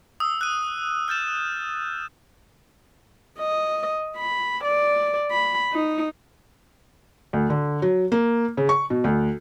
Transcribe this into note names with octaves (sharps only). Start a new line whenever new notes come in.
D#6 E6
F#6 D#7
F6 G6 A6 E7
D#5
B5
D5
B5
D#4
D2
D3
F#3
A#3
C#3
C#6
B2
D2